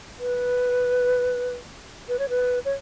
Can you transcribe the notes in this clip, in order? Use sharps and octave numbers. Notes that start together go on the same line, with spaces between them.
B4
B4
C#5
B4
C#5